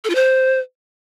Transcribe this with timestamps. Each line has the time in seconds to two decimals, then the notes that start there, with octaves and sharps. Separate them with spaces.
0.04 A4
0.10 F4
0.15 C5